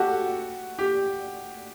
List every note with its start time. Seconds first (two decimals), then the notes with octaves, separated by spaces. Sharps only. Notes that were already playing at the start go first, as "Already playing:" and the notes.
Already playing: F#4 G4 A4
0.79 G4